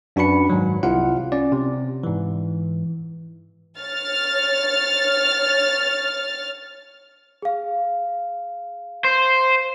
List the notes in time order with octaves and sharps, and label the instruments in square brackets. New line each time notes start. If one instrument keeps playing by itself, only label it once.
[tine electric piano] F#2 D4 F#4 B4 B5 C#7
G#2 D#3 F#3
C2 C3 E4 F4 F5 F#5
C#4 D5
C3
G#2 E3
[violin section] C#5 F6 A6
[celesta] G#4 F5
[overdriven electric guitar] C5